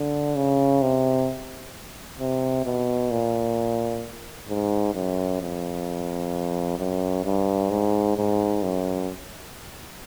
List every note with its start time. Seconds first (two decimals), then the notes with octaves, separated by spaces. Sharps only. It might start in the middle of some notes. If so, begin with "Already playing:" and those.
Already playing: D3
0.35 C#3
0.82 C3
2.20 C3
2.65 B2
3.11 A#2
4.49 G#2
4.94 F#2
5.41 F2
6.78 F#2
7.24 G2
7.70 G#2
8.16 G#2
8.62 F#2